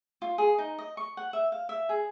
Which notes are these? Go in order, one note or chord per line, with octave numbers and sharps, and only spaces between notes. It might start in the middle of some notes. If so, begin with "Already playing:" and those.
F4
G#4
D#4
D#5
C#6
F#5
E5
F5
E5
G#4